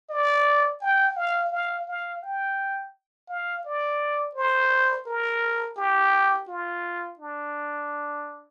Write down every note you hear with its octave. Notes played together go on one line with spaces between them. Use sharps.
D5
G5
F5
F5
F5
G5
F5
D5
C5
A#4
G4
F4
D4